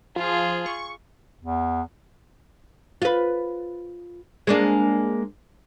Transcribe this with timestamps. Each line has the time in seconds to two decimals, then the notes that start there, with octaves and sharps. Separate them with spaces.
0.16 F3 F4 G#4
0.66 C#6
1.41 E2
3.02 F4 B4
4.47 G#3 A#3 D4